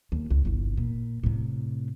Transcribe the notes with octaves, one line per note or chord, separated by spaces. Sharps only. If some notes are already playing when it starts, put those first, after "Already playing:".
D#2
C#2
G1 C2
A#2
A2 C3